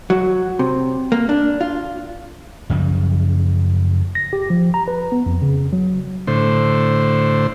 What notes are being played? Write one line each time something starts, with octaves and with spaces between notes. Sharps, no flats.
F#3
C3
A#3
D4
F4
F#2 C#3 F3 G3
A#6
G4
F3
A#5
B4
B3
F2
C#3
F#3
A2 D3 C5